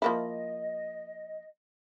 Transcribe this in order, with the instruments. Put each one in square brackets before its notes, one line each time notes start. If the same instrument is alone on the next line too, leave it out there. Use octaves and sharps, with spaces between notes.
[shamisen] F3 A#3 E4 [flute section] D#5